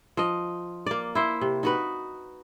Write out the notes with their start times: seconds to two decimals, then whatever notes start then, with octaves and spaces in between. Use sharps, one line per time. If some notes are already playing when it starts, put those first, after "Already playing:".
0.17 F3 D#5
0.86 A#3 D5
1.15 E4 C5
1.41 C3
1.63 D#4 F#4 B4